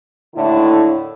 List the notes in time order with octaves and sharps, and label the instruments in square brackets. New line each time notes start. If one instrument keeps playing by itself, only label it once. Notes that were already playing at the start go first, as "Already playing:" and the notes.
[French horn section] D#2 A2 D3 E4